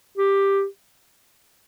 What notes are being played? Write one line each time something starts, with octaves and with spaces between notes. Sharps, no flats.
G4